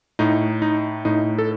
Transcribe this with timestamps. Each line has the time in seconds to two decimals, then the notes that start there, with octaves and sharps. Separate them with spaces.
0.19 A2 D#4
0.62 D#4
1.05 A2 D#4
1.38 A4